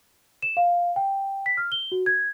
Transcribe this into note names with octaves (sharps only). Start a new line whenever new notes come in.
E7
F5
G5
B6
F6
G7
F#4
G#6